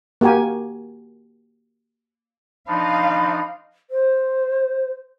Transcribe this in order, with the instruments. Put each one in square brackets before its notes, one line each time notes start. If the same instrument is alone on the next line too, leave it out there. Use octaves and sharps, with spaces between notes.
[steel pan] A#3 F#4 G4 A#4 G#5
[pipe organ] F3 D4 D#4 [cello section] D#5 F5 [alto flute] B5
[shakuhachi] C5